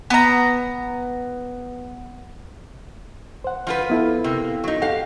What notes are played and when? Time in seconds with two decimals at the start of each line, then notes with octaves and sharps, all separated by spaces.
0.10 B3 A#5
3.44 C5 F#5
3.67 F3 F4 B4
3.90 B3 E4 A4
4.24 C3 A#3
4.64 F#3 D#4
4.82 F2 G4 A4 F5 F#5